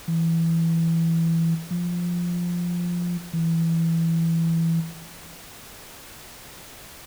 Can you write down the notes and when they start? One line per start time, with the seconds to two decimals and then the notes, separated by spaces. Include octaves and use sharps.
0.08 E3
1.71 F3
3.33 E3